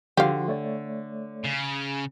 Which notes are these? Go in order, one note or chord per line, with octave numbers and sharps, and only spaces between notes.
D3 F3 F#4 G4 F5 C6
A3 C#5 D5
C#3